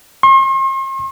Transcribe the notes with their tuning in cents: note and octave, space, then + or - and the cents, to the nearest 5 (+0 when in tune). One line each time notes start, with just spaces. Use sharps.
C6 +45